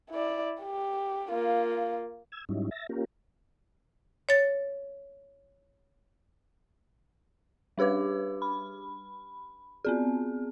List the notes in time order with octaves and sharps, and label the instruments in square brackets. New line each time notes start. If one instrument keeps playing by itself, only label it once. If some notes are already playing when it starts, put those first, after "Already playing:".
[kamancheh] E4 D5
G4
A#3 F4
[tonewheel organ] E6 G#6
G#2 F#3 G3 C#4 D#4 E4
E5 A6 A#6
A#3 C#4 F4 G4 A#4
[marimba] C#5 A6
[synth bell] G3 D4 G4 B4 D6
B5
B3 C4 G#4